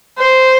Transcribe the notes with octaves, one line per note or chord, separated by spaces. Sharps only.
C5